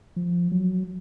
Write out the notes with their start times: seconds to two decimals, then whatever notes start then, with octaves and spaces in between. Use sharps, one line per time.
0.16 F3
0.51 F#3